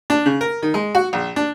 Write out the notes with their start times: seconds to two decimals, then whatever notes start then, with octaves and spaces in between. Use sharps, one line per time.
0.10 D4
0.26 C#3
0.41 A#4
0.62 D#3
0.74 G#3
0.95 F#4
1.13 A#1
1.36 D4